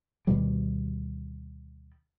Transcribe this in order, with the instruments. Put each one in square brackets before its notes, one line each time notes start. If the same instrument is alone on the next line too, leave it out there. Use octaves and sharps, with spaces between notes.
[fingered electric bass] D2 B2 D#3 G3